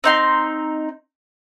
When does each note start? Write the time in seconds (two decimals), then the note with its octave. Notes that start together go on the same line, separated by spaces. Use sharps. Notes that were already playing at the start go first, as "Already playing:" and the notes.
0.04 C4 D#4 C6